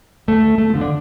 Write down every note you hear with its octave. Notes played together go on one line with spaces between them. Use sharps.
D2 A3
A3
D3 F3
D4